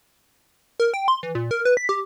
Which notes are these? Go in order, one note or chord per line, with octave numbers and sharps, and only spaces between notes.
A#4
G5
C6
E3
A#2
A#4
B4
B6
G4